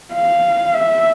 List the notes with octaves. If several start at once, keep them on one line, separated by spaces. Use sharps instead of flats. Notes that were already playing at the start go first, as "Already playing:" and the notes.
F5
E5